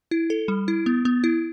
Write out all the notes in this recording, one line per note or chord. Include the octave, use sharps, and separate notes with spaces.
E4
A4
G3
E4
B3
B3
E4